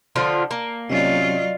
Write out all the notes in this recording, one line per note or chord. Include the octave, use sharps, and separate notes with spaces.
D3 F3 F4
A#3
C3 F#3 C#4 F4 D5 D#5